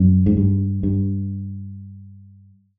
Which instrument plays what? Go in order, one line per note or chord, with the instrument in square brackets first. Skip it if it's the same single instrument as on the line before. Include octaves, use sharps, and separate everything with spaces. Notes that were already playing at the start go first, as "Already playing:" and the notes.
Already playing: [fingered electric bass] F#2
G#2
G2
G2